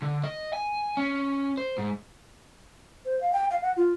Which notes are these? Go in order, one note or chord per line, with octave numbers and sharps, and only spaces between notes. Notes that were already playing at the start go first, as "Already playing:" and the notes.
D3
D#5
G#5
C#4
C5
G#2
C5
F5
G5
F5
F#5
F4